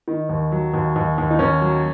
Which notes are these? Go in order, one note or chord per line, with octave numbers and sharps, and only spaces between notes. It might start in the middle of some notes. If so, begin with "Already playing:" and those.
D#3
D#2
F#3
D#2
D#2
D#2
D#4
D#2 C#4
F#3